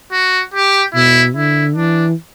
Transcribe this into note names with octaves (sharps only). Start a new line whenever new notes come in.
F#4
G4
B2 E4
D3 E4
E3 D4